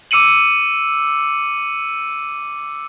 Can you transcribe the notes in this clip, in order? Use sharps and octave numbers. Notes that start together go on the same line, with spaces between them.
D6 E6 C#7 D#7 F#7